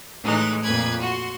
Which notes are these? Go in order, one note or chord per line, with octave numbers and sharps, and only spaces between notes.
A2 E3 G#3 D#4 F#6
F2 A#2 B4 G#6
F#4 C6